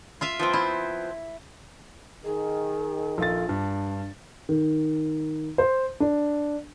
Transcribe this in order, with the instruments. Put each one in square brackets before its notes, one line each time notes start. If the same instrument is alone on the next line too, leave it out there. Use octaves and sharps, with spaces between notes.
[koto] F4 E5 F5
[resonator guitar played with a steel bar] F3 B3 C4
[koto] E4
[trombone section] D#3 [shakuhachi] G#4
[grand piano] A#1 F4 A6 [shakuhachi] A4
[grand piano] G2 [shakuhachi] D4
[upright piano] D#3
C5
D4